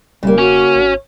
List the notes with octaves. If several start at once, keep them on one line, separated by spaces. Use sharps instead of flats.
E1 C#3 G3 A#3
C#4 F#4
G#1